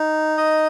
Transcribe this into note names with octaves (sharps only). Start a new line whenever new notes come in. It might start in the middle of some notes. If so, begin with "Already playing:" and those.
Already playing: D#4
D#5